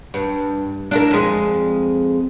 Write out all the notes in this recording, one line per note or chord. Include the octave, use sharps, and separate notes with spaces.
G2
D4 E4 A#4
F2 G#3